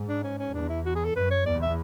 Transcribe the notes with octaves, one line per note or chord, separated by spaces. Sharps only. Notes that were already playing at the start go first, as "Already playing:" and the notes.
Already playing: G#2
D4
C#4
C#4
E2 D4
E4
F#4
G#4
A4
F#2 B4
C#5
E2 D5
E5